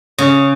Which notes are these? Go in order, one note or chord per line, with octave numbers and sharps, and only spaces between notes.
C#3